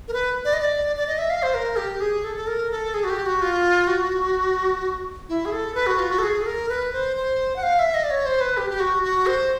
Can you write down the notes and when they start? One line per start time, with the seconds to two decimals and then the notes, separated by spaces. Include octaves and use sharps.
0.08 A#4
0.13 B4
0.45 D5
0.53 D#5
0.60 D5
0.96 D5
1.07 D#5
1.18 E5
1.30 F5
1.42 C5
1.54 A#4
1.76 G4
2.00 G#4
2.24 A4
2.36 A4
2.47 A#4
2.71 A4
2.94 G#4
3.04 F#4
3.09 G4
3.26 F#4
3.42 F4
3.87 F#4
5.29 E4
5.45 G#4
5.52 A4
5.75 B4
5.86 F#4
5.99 F4
6.11 F#4
6.18 A4
6.23 G#4
6.41 A4
6.46 A#4
6.69 B4
6.93 C5
7.17 C5
7.56 F#5
7.63 F5
7.79 E5
7.94 D#5
8.04 D5
8.10 C#5
8.26 C5
8.41 B4
8.57 G4
8.70 G4
8.80 F#4
9.03 F#4
9.27 C5